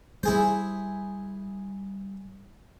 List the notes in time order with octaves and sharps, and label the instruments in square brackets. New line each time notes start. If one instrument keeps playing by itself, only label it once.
[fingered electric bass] G3 [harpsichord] E4 G#4 C5